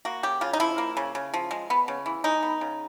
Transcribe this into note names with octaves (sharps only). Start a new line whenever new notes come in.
A#3 F#4
C#3 G4
C#3 F4
D#4
F3 E4
A#3
C#3
C#3
F3
G#3
B3
C#3
E3
G#3 D#4
B3
C#3